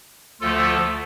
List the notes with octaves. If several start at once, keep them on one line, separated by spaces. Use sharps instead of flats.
D2 D3 F3 A3 F4 A4